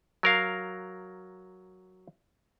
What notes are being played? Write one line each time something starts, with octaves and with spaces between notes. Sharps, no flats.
F#3 A#4 F5